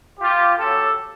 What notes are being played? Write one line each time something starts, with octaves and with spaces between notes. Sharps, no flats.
F4 G4
C#3 F#3 G4 A4